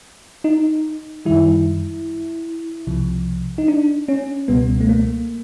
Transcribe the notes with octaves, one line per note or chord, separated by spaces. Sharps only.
D#4
F#2 D#3 G3 E4
C2 C3 F3
D#4
D4
C#4
C#2 B2 G3 B3
A3
A#3